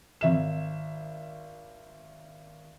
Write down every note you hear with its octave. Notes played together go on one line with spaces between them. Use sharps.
G#1 E5 E7